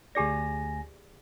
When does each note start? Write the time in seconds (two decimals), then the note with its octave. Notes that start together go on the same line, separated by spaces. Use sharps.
0.15 D2 G4 G#4 D5 G#5 A#6